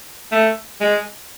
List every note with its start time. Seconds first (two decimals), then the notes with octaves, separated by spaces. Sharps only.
0.32 A3
0.81 G#3